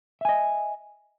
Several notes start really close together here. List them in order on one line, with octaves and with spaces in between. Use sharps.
E5 G#5 D#5